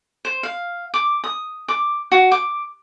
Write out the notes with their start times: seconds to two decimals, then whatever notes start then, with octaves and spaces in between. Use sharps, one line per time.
0.25 C5
0.43 F5
0.94 D6
1.24 D#6
1.68 D6
2.12 F#4
2.31 D6